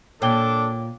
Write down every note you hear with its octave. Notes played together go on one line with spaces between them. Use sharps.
A#2 D4 A4 C#5 G5 D6 G7